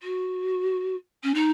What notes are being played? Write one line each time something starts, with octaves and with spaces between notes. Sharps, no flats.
F#4
C#4
D#4